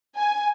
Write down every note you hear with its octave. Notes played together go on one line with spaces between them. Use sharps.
G#5